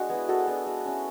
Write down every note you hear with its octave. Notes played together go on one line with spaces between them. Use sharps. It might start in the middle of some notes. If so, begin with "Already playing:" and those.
Already playing: G#3 D4 F#4
B3 E4 G#4
G#3 F#4 A4
B3 D4
G#3
C#4 E4